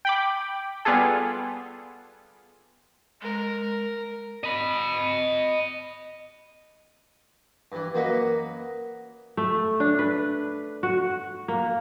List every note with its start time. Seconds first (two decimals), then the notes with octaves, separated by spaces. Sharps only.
0.05 G5 B5 D6
0.85 G3 B3 F4 G#4 A4
3.22 G#3 A#4
4.44 D#5 B5
7.72 G2 E3
7.95 F#2 A#3 F#4 B4 D#5
9.37 A3
9.80 D4
9.99 B4
10.83 F#4
11.48 A#3